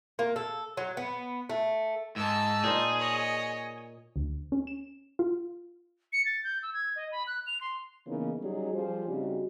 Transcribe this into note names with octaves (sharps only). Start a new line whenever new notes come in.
A#3
A4
F#3
B3
A3
G#2 A5 E6
A#2 D#4 G#4 C5
C#5 D#5
D2
C#4
E7
F4
C#7
A6
G6
E6
G#6
D#5
B5
F#6
F7
C6
C#3 E3 A#3 B3 C#4 D#4
F#3 G3 C#4 D#4 G#4
F3 G3 G4 G#4 C5
C#3 G3 C4 D#4 F#4